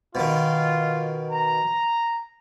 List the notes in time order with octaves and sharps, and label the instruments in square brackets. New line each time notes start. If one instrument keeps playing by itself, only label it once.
[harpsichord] B2 D#3 [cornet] F4
[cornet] A#5